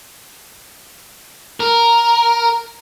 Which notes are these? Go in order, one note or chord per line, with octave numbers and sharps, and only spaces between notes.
A#4